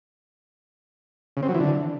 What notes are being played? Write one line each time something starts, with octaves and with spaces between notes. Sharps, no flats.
C#3
C4
F#3
E3
D3